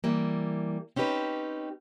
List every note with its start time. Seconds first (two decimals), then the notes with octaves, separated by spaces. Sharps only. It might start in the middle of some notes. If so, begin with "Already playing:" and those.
0.04 E3 G3 A#3
0.96 C4 C#4 D#4 G4 B4